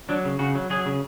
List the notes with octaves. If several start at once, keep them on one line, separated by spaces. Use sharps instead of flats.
F#3 D4
C#3
C#3 F#4
F#3
F#3 G#4
C#3